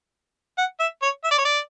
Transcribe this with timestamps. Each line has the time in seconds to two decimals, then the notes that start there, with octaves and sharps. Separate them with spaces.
0.58 F#5
0.80 E5
1.02 C#5
1.24 E5
1.31 D5
1.38 C#5
1.45 D5